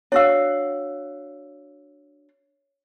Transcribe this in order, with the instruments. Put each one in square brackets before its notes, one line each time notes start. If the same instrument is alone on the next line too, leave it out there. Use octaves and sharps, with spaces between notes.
[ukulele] D4 F#4 F5 [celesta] C#5 E6